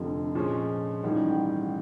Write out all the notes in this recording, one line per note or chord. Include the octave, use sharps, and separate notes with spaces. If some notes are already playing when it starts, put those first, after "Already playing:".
Already playing: F1 F2 D3 F3
A#2 F3 G#3 C#4
A1 G#2 D#3 G3